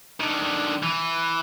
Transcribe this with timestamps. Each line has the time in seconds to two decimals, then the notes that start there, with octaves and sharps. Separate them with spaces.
0.20 D3 D#3
0.82 E3